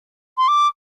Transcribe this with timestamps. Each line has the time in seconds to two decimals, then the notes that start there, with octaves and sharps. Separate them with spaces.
0.38 C6
0.48 D6